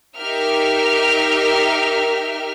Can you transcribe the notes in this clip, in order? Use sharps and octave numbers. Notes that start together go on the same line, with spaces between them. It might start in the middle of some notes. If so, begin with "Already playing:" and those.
D#4 G4 A#4 E5 G5 F6